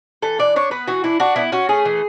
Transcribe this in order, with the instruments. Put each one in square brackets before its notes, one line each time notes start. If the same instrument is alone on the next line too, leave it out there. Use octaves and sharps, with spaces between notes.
[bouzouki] E3 A4
D4 D5
D4 C#5
B3 B4
E3 F#4
D4 E4
D4 F#4
B3 E4
C#4 F#4
A3 G#4
E3